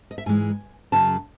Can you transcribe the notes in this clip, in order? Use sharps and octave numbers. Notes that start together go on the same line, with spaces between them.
D#5
E5
G#2 E3 G#3 G#5
F#2 C#3 F#3 A5